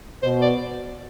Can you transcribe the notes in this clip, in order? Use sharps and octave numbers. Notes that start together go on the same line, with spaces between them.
B2 C5
D5